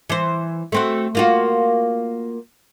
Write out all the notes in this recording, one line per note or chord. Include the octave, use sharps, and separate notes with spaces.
E3 C5
A3 C4 F#4
A#3 F4 F#4